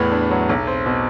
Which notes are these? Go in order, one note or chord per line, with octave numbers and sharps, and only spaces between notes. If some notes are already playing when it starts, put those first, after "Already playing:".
Already playing: E2 A2 B3
D4
F#3
B1
C4
B2